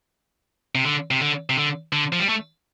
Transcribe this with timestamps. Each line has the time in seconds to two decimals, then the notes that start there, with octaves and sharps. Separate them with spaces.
0.75 C3
0.85 D3
1.11 C3
1.21 D3
1.50 C3
1.57 D3
1.92 D3
2.12 F3
2.20 G3
2.29 A3